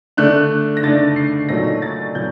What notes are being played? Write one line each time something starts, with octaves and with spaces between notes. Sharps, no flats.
D3 A3 D4 F#6
A#6
D3 A3 D4 A6
C7
A#2 F#3 A3 D#4 A#6
A6
A#2 F#3 G6